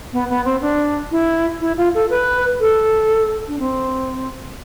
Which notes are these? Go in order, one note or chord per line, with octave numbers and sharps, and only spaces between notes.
B3
B3
C4
D4
E4
E4
F4
A4
B4
A4
D4
C4